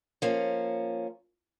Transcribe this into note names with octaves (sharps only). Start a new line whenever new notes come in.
F3 A#3 C#4